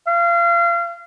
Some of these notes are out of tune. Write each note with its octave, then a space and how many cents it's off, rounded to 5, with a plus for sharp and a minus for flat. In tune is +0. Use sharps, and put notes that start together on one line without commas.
F5 -30